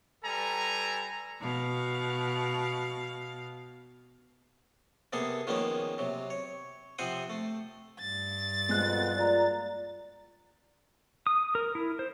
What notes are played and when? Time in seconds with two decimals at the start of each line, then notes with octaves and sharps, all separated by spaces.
0.24 G3 A4 B4 G#5 A#5
1.41 B2 F5
5.13 C3 A#3 B3 G#4 A4
5.47 D#3 F3 G#3 A#3 B3 C#4
5.98 C3 F#3
6.30 C#5
6.98 C3 F3 C4 C5 F#5 D#6
7.30 A3
8.00 G2 A6
8.69 F2 B2 G#3 F#6
9.17 A#3 F4 D5 A#5
11.27 D#6
11.55 A#4
11.75 E4
11.99 C5